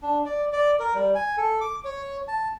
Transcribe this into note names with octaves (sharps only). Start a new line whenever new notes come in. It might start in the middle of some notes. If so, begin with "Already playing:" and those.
D4
D5
D5
A#4
G3
G#5
A4
D6
C#5
A5